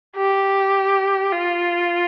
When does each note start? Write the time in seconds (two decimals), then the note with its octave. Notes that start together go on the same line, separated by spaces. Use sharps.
0.16 G4
1.32 F4